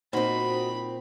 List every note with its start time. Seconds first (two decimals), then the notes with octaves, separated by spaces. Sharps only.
0.13 A#2 C4 D#4 F#4 C5 D#5 B5